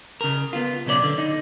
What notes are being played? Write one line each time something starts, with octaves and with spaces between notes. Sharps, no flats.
C#3 A#4
B3 F4
B1 C#3 C#4 A4 D5
D3
D#4